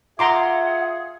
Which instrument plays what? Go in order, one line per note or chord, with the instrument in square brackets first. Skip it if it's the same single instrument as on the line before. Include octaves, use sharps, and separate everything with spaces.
[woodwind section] F4 G#4 [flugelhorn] E5 [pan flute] F#5 [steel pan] A#5 C6 D6